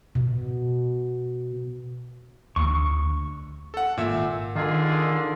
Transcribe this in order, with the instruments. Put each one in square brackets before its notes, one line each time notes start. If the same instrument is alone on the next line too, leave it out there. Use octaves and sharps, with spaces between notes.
[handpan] B2
[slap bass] D2 [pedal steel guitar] C#6
[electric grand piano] A4 F#5
[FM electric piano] G#1 E6 [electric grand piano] A#2 E5
[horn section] D3 F4 G#4 [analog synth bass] D#3